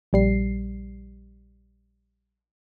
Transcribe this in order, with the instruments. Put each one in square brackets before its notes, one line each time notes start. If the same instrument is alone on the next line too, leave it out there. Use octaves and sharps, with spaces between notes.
[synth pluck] A#1 G3 C7